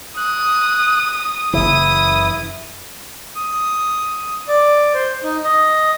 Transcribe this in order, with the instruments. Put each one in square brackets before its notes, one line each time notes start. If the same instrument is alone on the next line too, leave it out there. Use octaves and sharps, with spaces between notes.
[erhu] D#6 [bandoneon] F#6
[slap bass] F#1 C#3 E3 [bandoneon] E4 [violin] D#6
[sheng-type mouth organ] D#6
D5
C5
D#4
D#5